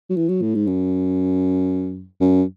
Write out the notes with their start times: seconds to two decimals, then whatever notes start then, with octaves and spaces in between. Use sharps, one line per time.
0.10 F#3
0.16 E3
0.29 F#3
0.42 A2
0.55 G#2
0.67 F#2
2.20 F#2